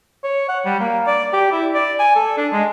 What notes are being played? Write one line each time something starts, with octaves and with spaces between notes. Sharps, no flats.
C#5
F#5
G3
A#3
D5
G4
E4
D5
G#5
A4
D4
G#3